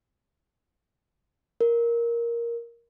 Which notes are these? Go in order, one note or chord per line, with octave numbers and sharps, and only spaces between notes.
A#4